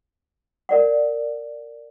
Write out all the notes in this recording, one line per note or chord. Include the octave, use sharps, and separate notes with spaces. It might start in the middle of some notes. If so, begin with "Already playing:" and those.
A#4 D5 F#5